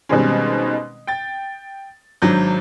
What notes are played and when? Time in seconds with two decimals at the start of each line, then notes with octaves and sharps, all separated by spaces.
0.09 B2 D#3 G3 G#3 C4 C#4
1.07 G5 A6
2.22 G#1 F#3 D4 G6